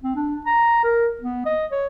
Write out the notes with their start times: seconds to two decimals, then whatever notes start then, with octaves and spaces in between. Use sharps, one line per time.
0.03 C4
0.16 D4
0.46 A#5
0.84 A#4
1.22 B3
1.46 D#5
1.71 C#5